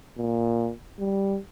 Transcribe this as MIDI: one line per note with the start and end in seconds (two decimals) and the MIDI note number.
0.17 0.71 46
0.99 1.38 55